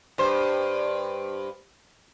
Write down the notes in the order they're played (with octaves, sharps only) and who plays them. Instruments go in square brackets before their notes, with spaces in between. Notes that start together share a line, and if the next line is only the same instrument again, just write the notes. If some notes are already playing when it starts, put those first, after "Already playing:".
[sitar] G2 C5